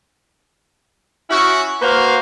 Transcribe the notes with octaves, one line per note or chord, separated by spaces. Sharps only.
C#4 E4 F#4
A#3 F#4 B4 C5 F5